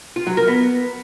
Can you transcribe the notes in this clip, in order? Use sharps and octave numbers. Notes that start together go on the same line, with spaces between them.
F4
F#3
A#4
B3